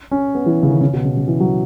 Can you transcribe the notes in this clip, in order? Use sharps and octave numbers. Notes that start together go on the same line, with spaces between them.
C#4
B3
E3
C#3
D#3
C#3
B2
C#3
C#3
E3
F#3